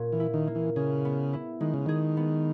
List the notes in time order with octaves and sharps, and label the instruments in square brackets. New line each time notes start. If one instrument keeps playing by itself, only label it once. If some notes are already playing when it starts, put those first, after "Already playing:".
Already playing: [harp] A#2 A#3 C#4
[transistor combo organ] E3
[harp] E4
[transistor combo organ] D#3
[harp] A#3
[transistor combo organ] E3
[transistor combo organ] C#3 [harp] G#4
[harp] B3
E4
[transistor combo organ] D#3 [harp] G#3
[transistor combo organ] C#3
[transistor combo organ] D#3 [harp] G#4
[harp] B3